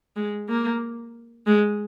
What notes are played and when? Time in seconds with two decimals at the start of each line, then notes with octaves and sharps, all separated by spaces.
0.16 G#3
0.49 A#3
1.47 G#3